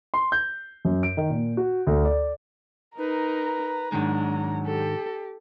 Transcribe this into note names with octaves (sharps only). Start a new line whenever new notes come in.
C6
G6
F#2
D7
D#3
A#2
F#4
D2
D5
D#4 A#4 B4 A#5
G#2 D#3 F#3 G#3 D4
G4 A4